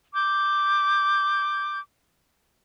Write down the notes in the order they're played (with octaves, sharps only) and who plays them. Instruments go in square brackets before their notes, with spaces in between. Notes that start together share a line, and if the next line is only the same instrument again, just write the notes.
[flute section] D6 G6